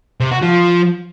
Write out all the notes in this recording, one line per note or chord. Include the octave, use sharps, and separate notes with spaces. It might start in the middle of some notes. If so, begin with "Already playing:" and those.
C3
F#4
F3